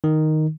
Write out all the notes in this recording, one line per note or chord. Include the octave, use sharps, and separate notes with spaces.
D#3